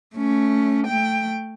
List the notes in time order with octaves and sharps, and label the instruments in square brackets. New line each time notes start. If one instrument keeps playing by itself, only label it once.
[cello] A3 C#4
A3 G5